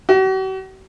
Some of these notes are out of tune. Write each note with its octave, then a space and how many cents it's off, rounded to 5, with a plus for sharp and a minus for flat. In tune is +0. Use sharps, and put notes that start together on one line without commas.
F#4 +45